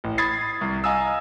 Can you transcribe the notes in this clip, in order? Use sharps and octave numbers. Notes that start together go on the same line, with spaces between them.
A1
B5 D#6 G#6 A6 C7
C2
D#5 F5 G#5 A#5 D#6 E6